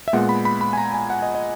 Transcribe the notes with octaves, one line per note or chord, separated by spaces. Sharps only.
E5
A#2 G#3 B3 F#5
B5
B5
B5
G#5
A#5
G#5
F#5
D#5
D#5